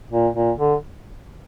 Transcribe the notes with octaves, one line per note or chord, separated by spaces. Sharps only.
A#2
A#2
D3